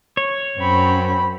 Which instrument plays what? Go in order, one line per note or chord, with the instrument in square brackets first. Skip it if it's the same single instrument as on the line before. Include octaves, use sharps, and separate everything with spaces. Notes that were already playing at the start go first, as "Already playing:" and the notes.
[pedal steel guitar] C#5
[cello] F#2 [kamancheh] C4 B5